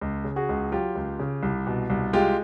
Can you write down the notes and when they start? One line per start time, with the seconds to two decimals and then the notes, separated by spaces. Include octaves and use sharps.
0.01 C#2
0.24 C#3
0.36 F#4 G#4
0.49 C#2
0.72 F#3 F4 G4
0.95 C#2
1.19 C#3
1.43 C2
1.67 B2
1.90 C2
2.13 G#3 F4 G4